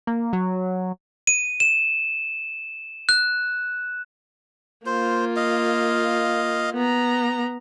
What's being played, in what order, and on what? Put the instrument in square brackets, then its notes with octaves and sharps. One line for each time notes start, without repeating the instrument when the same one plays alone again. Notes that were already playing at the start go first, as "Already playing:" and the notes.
[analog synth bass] A#3
F#3
[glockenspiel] D#7
E7
F#6
[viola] A#3 F4 [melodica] C5
[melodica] D#5 F5
[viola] B3 A#5